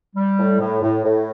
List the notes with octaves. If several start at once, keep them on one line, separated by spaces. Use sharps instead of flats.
G3
A2
A2
A2
A2